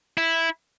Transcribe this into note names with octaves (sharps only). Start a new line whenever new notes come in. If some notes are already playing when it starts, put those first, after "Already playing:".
E4